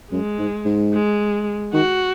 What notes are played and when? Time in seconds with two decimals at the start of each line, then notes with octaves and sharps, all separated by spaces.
0.12 F#2 G#3
0.39 G#2
0.65 G#2
0.93 G#3
1.73 D#3 F#4